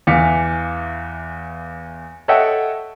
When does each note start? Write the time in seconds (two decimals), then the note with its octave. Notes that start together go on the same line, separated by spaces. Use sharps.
0.07 E2 E3 F5 D6 B6 C#7
2.28 A4 C#5 D#5 E5 F#5 G5